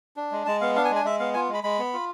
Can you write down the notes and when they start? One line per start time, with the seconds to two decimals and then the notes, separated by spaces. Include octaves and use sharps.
0.17 D4
0.32 G#3
0.46 G#3 A5
0.61 B3 F5
0.75 D4 F5
0.85 G#5
0.90 G#3
0.95 G#5
1.05 G#3 E5
1.19 B3 F5
1.34 F4 G#5
1.49 G#3 B5
1.64 G#3 B5
1.79 B3
1.93 F4